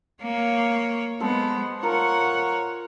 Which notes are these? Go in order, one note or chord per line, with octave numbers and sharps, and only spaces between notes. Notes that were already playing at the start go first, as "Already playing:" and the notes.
A#3 C#5
G#3 B3 A4 C5
F4 A#4 C#5 F#5